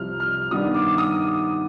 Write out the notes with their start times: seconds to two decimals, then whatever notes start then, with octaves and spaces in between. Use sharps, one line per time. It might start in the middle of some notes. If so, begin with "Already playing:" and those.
Already playing: C2 C3 F3 F6
0.20 F6
0.51 G2 D#3 B3 D4 D#6
0.74 D6
0.98 D#6